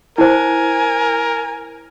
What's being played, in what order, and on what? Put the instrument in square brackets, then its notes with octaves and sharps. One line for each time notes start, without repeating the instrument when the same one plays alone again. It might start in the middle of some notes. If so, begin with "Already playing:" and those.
[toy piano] E4 C5 [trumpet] A#4 [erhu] G#5